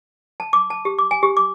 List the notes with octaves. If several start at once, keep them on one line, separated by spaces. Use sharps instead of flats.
A5
D6
A5
G4
D6
G#5
G4
D6